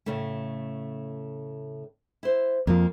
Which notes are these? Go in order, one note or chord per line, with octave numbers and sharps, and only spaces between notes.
A2 C#3 A3
E4 C5
F2 F3 A#3